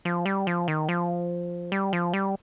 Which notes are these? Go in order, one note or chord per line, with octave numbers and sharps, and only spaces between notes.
F3
G3
F3
D#3
F3
G3
F3
G3